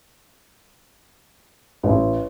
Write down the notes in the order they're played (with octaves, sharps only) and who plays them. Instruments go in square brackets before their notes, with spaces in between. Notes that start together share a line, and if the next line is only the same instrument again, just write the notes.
[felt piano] A1